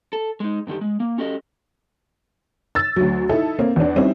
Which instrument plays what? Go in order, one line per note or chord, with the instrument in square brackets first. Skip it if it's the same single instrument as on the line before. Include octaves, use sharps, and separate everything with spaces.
[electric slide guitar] A4
G#3 D#4
G2 D3 D#3 G4
G#3
A#3
C#4 F#4 G4 A4 D#5
[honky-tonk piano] E6 A6
D2 F#3
D#4 E4 A4
A#3 C4
E2 D4
G3 C4 C#4 D#4 E4